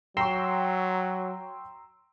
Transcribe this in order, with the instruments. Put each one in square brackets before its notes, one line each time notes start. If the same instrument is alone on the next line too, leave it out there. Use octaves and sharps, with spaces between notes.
[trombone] F#3 [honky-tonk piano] G5 C#6 [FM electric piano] A#5 C6 E6